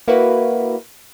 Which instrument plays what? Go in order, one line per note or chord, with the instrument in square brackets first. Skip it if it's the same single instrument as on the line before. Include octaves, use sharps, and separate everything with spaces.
[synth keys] A#3 E4 F#4 B4